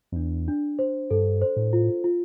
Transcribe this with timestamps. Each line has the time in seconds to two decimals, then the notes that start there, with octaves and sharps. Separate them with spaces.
0.12 F2
0.16 E2 D4
0.48 D4
0.79 C5
1.11 G2 A4
1.42 C5
1.56 A2
1.73 F4
2.04 F4